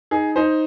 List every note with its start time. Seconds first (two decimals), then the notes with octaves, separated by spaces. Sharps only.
0.11 D#4 G#4
0.36 D#4 C5